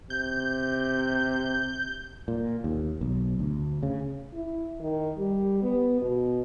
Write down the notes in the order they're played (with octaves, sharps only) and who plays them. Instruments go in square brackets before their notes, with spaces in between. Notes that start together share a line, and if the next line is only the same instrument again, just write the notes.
[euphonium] C3 [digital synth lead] G6
[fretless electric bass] A#2
D#2
B1
D2
C#3
[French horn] E4
D#3
G3
B3
B2